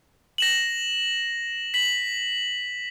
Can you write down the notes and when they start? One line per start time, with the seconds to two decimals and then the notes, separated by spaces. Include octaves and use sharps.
0.38 A#6 E7 F#7
1.74 B6 F#7